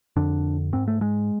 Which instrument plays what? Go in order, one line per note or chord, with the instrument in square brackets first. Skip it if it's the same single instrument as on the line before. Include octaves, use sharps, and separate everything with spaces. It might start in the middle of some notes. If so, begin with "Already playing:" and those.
[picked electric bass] F2 D3 D4
G#2 C4
A3
G#3